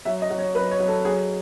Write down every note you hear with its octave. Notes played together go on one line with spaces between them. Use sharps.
F#3 E5
D#5
F#3
C#5
F#3 B4
C#5
F#3
A4
F#3 G#4